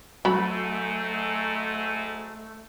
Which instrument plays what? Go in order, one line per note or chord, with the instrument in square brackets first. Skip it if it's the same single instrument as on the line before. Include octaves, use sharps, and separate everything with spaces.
[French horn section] G#2 [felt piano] F#3 [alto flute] A3 [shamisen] F#4 B5